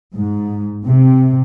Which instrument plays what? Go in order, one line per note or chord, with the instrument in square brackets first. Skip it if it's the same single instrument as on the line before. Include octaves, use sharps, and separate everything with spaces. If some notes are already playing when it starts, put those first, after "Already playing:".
[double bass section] G#2
C3